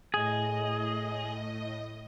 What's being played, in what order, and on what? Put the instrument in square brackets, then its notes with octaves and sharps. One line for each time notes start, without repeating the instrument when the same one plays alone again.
[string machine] A2 D#5 [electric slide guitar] G#4